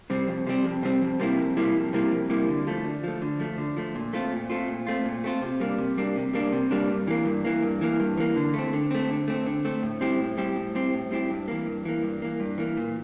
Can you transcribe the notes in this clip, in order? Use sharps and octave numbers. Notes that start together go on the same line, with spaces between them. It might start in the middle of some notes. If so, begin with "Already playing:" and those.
C3 G3 C4
F2
C3 G3 C4
F2
C3 G3 C4
F2
C3 G3 A#3 E4
F2
C3 G3 A#3 E4
F2
C3 G3 A#3 E4
F2
C3 G3 A#3 E4
D3
F3 A3
D3
F3 A3
D3
F3 A3
D3
F3 A3
A#2
A3 C4 F4
A#2
A3 C4 F4
A#2
A3 C4 F4
A#2
A3 C4 F4
C3
G3 A#3 D4
C3
G3 A#3 D4
C3
G3 A#3 D4
C3
G3 A#3 D4
G2
E3 A#3
G2
E3 A#3
G2
E3 A#3
G2
E3 A#3
D3
A3 C4
D3
A3 C4
D3
A3 C4
D3
A3 C4
A2
G3 C4 E4 G4
A2
G3 C4 E4 G4
A2
G3 C4 E4 G4
A2
G3 C4 E4 G4
G2
E3 A#3
G2
E3 A#3
G2
E3 A#3
G2
E3 A#3
A#2